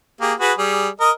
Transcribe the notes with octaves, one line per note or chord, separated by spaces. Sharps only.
A#3 G4 G#4
F#4 G#4 B4
G3 G#4
A#4 D#5 D#6